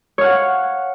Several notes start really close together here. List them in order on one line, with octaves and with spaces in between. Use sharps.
C#5 F5 F#5